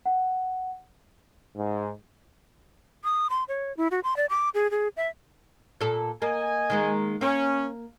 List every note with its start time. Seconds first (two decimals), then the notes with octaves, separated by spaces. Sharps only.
0.06 F#5
1.56 G#2
3.04 D#6
3.30 C6
3.48 C#5
3.77 E4
3.91 F#4
4.04 C6
4.17 D5
4.30 D6
4.54 G#4
4.71 G#4
4.97 E5
5.81 A#2 A4
6.22 A#3 D#5 G#5
6.70 D#3 G#3 A#3
7.21 A#3 C#4